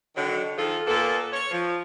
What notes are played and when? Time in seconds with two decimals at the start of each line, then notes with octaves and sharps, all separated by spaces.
0.15 D3 D#3 F#3
0.57 D#3 F3 F4 G#4 A4
0.87 A#2 A#3 B3 A4
1.32 C#5
1.51 F3